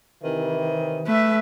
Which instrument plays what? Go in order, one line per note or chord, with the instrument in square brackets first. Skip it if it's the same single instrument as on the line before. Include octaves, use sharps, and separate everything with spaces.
[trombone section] C3 E3 [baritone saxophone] D#3
[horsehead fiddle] A3 [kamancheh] B4 E5